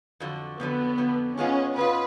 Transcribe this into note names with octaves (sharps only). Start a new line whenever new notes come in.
F2 D3 F#3
F2 D3 F#3 B3
F2 D3 F#3
G#2 G#3 B3 C#4 F4
G#2 G#3 B3 F4 B4